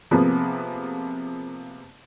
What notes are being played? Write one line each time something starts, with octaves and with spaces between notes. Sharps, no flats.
C3 F3 A#3 B3 G#4